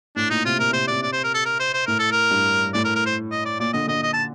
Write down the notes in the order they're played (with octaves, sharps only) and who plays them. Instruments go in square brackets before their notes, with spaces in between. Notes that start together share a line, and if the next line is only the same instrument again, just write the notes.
[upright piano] A2 [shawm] D4
[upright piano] A#2 [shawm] D#4
[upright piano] C3 [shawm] F4
[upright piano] A#2 [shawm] A#4
[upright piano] C3
[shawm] C5
[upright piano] C3 [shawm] D5
[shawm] D5
C5
A#4
A4
A#4
C5
C5
[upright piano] A2 [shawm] A#4
[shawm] A4
A#4
[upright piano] G2
[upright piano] A2 [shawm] D5
[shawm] A#4
A#4
C5
D#5
D5
[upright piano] A#2 [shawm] D5
[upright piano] D3 [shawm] D#5
[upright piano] D3 [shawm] D#5
[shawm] D#5
A5